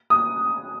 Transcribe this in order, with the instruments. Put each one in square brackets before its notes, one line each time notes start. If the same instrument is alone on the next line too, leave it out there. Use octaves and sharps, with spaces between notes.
[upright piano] D#6